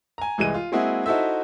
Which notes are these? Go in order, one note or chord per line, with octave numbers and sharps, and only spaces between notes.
G#5 A#5
C2 E3 G#3 D#7
F4
G#3 A#3 C4 E4 F#4 G#4
D#4 E4 F#4 A4 C5 E5